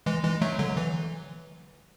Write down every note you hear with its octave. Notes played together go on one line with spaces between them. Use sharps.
E3 G#3
E3 G#3
F#3 A3
D3 F#3
E3